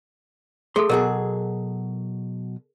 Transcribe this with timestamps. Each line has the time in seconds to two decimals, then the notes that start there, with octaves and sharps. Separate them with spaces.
0.76 A3 G#4 A4 C6
0.89 B2 F#3 G#4 A#4